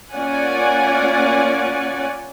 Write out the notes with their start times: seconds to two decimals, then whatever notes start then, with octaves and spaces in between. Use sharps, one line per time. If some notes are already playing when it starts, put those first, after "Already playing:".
0.15 A#3 C#4 F4 D5 F#5 G#5